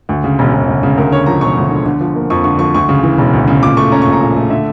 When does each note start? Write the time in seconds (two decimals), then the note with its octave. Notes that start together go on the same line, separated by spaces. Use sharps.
0.09 D2
0.24 C#3
0.39 E1
0.53 E1
0.68 D2
0.83 C#3
0.97 D2 A#4
1.12 D3 C#5
1.26 F3 A#5
1.41 E1 C#6
1.57 D2
1.71 D3
1.86 D3
2.01 F3
2.15 A#3
2.30 F2 C#6
2.44 D3 C#6
2.59 F3 C#6
2.74 D2 C#6
2.89 C#3
3.03 E3
3.18 E1
3.33 D2
3.48 C#3
3.62 A#2 D6
3.77 A3 C#6
3.92 C#4 A#5
4.02 A#1 C#6
4.13 A#5
4.21 A#2
4.36 A3
4.50 D3 E5